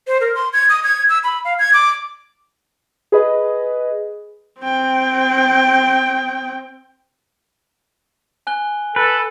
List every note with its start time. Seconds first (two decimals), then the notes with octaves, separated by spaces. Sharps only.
0.07 C5
0.21 A#4
0.35 C6
0.53 G#6
0.69 D#6
0.84 G#6
1.09 E6
1.24 B5
1.45 F5
1.59 G#6
1.73 D6
3.12 G#4 B4 D#5
4.61 C4 G5
8.47 G#5 F#6 G7
8.96 A4 B4